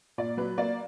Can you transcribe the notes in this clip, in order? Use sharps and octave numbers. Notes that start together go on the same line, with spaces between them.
A#2 D5
F#3 B4
A#3 D5